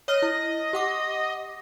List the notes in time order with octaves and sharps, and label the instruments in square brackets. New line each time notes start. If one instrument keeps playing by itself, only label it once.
[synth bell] C#5 F6 [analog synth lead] D#5
[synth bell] E4
G4 F#5 D6